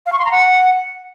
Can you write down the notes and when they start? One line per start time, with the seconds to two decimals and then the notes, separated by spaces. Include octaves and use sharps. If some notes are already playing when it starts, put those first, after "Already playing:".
0.06 F5
0.12 C#6
0.19 C6
0.25 A#5
0.31 F#5